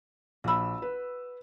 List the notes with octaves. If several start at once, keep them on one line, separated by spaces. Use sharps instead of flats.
A#1 F#4 B5 E6
B4